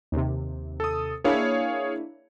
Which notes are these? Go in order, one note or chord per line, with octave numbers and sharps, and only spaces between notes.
D#2 C3
A4 D#6
A#3 D4 E4 G#4 C#5 F5